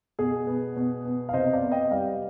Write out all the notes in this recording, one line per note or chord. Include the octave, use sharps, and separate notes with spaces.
B2 G#4
B3
B2
B3
F5
C3 C5 D#5
D5 F5
B3
D#5 G5
G3 D5 F5